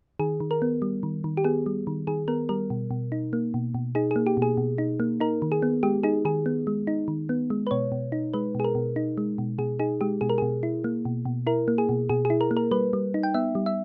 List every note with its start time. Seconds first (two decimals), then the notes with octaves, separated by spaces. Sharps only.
0.19 D#3 G#4
0.40 D#3
0.51 A#4
0.62 B3
0.82 G3
1.03 D#3
1.24 D#3
1.37 G4
1.44 B3 G#4
1.66 G3
1.87 D#3
2.07 D#3 G#4
2.28 B3 A#4
2.49 G3 A#4
2.70 B2
2.91 B2
3.12 D#4
3.33 A#3
3.54 B2
3.74 B2
3.95 D#4 G#4
4.11 A#3 G#4
4.27 G4
4.37 B2
4.42 G#4
4.57 B2
4.78 D#4
5.00 A#3
5.20 D#4 A#4
5.42 D#3
5.52 G#4
5.62 B3
5.83 G#3 G4
6.03 D#4 G#4
6.25 D#3 G#4
6.46 B3
6.67 G#3
6.87 D#4
7.08 D#3
7.29 B3
7.50 G#3
7.67 B4
7.71 B2 C#5
7.92 B2
8.12 D#4
8.34 G#3 B4
8.55 B2 G#4
8.64 A#4
8.75 B2
8.96 D#4
9.18 G#3
9.38 B2
9.58 B2 G#4
9.79 D#4 G#4
10.01 G#3 G4
10.21 B2 G#4
10.30 A#4
10.38 B2 G#4
10.63 E4
10.84 A#3
11.05 B2
11.25 B2
11.47 E4 A#4
11.68 A#3
11.78 G#4
11.89 B2
12.09 B2 G#4
12.25 G#4
12.30 E4
12.41 A#4
12.51 A#3
12.57 A#4
12.71 G3 B4
12.93 G3
13.14 D#4
13.23 G5
13.34 B3 E5
13.55 G3
13.66 E5